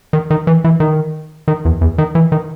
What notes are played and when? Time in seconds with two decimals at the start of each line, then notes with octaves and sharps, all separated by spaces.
0.13 D#3
0.30 D#3
0.47 E3
0.64 E3
0.80 D#3
1.48 D#3
1.65 E2
1.81 E2
1.98 D#3
2.15 E3
2.32 D#3